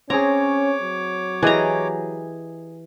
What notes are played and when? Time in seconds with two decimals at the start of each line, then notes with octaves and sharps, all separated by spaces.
0.10 C4 C#4 G#4 C#5 A#5 D6
0.82 F#3
1.43 E3 G4 G#4 D#5 A#5